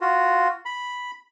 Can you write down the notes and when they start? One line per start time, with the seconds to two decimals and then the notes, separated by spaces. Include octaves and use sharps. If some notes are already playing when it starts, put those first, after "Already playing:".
0.01 F4 F#4
0.65 B5